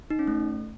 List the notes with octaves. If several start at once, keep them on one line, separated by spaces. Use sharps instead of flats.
D#4
C#4
A3